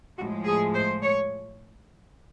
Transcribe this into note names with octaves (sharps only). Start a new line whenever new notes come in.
A2 F3 G#3 F#4
G#4
C5
C#5